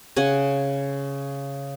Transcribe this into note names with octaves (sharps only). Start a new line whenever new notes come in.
C#3 F#5 G#5